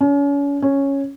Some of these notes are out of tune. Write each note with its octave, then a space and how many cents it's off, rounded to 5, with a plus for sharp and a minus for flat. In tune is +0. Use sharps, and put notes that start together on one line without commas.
C#4 +35
C#4 -5